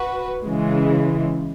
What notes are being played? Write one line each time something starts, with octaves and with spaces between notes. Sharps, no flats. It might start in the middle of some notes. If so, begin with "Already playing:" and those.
Already playing: F#4 B4
C#3 E3 G#3